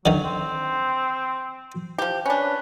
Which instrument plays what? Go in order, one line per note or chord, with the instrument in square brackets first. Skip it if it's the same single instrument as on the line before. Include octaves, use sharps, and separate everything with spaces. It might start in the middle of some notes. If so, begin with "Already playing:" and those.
[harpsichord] D3 D#3 [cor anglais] F#3
[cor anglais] C4
[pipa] F3 G4
[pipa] C#4 D4 [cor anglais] B4